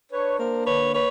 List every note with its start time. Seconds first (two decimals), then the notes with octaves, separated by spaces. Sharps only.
0.12 D4 B4 C#5
0.39 A#3 A#4 C5
0.67 D3 B4 C#5
0.94 B4 C#5